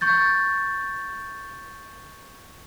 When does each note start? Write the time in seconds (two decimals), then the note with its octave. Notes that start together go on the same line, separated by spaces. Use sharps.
0.01 C#6 G6 A6